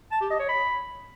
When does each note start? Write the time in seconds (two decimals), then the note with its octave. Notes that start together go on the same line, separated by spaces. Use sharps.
0.12 A5
0.21 G4
0.30 D#5
0.40 C#5
0.49 B5